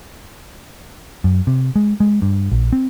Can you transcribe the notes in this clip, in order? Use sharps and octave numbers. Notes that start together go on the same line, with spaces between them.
F#2
C3
G#3
G#3
G2
A#1
C4